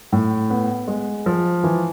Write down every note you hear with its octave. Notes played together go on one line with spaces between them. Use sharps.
A2
B3
G#3
F3
E3